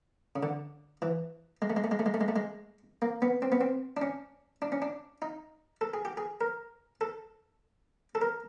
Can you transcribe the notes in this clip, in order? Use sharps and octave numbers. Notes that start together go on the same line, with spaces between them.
C#3
D3
E3
G#3
A3
G#3
A3
G#3
A3
G#3
A3
G#3
A3
G#3
A#3
B3
C4
B3
C4
D4
C#4
D4
C#4
D4
D#4
A4
G#4
G4
G#4
A#4
A4
A4
A#4